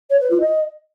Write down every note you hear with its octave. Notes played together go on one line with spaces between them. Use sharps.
C#5
B4
F4
D#5